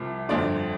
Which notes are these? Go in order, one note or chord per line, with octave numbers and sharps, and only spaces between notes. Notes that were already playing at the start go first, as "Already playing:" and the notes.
Already playing: C2 C3 F3
G1 F2 D3 D5